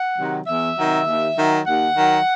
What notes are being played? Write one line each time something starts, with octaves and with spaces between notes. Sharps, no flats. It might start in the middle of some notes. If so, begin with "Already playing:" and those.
Already playing: F#5
C3 D#3 F#3
E2 E5
C3 D#3 F#3
D#2
D#3 F#3
D#2 F#5
D#3 F#3